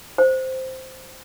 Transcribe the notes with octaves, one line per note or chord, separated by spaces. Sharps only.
C5